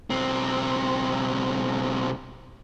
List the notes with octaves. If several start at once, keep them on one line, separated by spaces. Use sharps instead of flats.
B1 C4